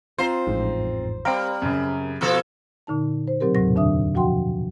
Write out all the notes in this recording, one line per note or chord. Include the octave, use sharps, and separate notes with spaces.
C4 F4 C5 A#5
A1 F2 G#2
G3 C4 A#4 F5 G5 D7
F#2 C#3
B2 F3 A4
A#2 D3 D#4 A5
C5
B2 F#3 C4 G4 A#4
D#2 A2 C3 F#3 A#6
F2 D3 D4 E5 D#6
B2 F3 F#4 F#5 G5 C6